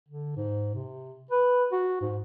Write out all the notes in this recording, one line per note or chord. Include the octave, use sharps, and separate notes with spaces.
D3
G#2
C3
B4
F#4
G#2